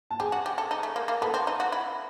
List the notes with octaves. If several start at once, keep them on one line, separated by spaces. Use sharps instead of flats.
A5
G4 G#4 G#5
F#4
G4
A4
D#4
A3
A#3
A#3
B3 A4 A5
C4
D#4
F#4
E4